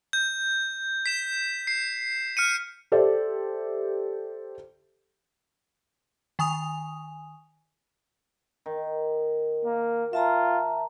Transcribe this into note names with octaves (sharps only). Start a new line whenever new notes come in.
G6
B6 E7
C7
F6 C#7 D#7
G4 A4 C5 D5 E5
D#3 G#5 D#6 F7
D#3
A#3
F4 E5 A5 A#5